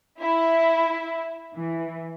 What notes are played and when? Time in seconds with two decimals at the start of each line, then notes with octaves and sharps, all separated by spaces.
0.21 E4
1.56 E3